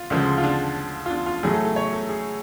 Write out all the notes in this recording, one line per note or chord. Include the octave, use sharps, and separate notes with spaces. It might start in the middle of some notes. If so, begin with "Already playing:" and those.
Already playing: F4
D2 C#3 F3 G#3
F4
D4
F4
D4
F4
A2 F#3 A3 G#4
A4
A4
C#5
A4
G#4